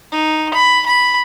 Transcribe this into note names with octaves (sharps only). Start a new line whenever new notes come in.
D#4
B5
B5